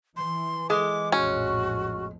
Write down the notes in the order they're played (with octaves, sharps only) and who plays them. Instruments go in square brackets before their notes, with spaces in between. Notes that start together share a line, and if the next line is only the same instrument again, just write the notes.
[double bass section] E3 [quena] C6
[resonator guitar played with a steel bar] G#3 [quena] D6
[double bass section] A#1 F2 A2 [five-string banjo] C#4 [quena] F#4